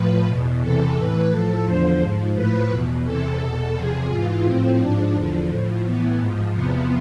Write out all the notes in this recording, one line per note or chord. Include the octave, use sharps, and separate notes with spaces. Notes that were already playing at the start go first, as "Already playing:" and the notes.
Already playing: A2 F3 B4
E2 B2
E2 C3 E3 A4
A2 E3 B4
A2 F3 A4
E2 D3 F3 C5
G#2 F3
A2 F3 B4
E2 B2
E2 C3 E3 A4
E2 B2 A4
E2 C3 F3 G#4
G#2 E3 F4
A2 F3 C4
G#2 F3 D4
E2 D3 F3
A2 F3
A2 E3 B3
G#2
F3
E2 C3 F3 B3